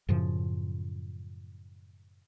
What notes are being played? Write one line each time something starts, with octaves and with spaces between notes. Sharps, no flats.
F#2 A2 C#3 F3